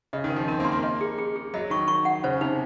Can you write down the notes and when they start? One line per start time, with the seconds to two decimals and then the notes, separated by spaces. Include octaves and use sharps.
0.13 C#3 D#5
0.24 D#3
0.30 A#4
0.36 F3
0.48 C4 A#4
0.60 A#3
0.65 C6
0.72 A#3
0.83 D#5
1.01 G#4
1.18 G#4
1.36 G#4
1.54 F#3 D#5
1.70 D#3 C#6
1.88 C#6
2.05 F#5
2.24 C#3 C5
2.41 C3 D#4